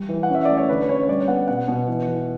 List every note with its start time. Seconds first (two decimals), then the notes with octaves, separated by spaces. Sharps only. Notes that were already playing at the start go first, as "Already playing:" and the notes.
Already playing: G3
0.09 E3
0.23 F#5
0.29 C#4
0.35 E5
0.45 A3 D5
0.57 C#5
0.69 D3 B4
0.82 B4
0.89 C#4 C#5
1.03 C#5
1.08 G3 D5
1.28 B3 F#5
1.48 B2 F#5
1.68 B2
1.88 E3
2.08 E3